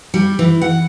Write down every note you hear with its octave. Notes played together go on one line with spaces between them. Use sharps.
G3
E3
F#5